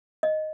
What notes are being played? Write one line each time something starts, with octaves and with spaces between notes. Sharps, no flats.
D#5